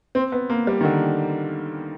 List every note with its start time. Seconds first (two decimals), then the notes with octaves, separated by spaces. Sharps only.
0.15 C4
0.32 B3
0.50 A#3
0.67 G3
0.81 D#3
0.84 D3